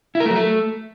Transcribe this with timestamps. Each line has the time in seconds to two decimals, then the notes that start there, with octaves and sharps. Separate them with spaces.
0.15 E4
0.20 A#4
0.25 A3
0.30 F#3
0.36 A3